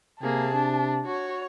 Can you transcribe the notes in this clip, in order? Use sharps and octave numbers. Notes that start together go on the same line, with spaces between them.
C3 A#3 G#4 A5
D4
F#4 C#5